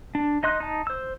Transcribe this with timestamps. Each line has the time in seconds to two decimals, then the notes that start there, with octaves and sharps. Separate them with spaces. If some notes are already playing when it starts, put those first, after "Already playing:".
0.15 D4
0.43 D#4 D#5 C6 F#6
0.60 D#4 A5
0.87 C5 E6